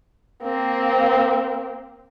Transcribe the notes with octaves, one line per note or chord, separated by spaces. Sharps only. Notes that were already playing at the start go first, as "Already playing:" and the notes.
A#3 C4